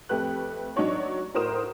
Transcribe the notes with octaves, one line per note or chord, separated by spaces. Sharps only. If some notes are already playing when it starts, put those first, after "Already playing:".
F2 A3 G4 B4 F#6
F#3 D4 D#4 F#4 C#5 D5
A2 F#4 A#4 C5 D#6 E7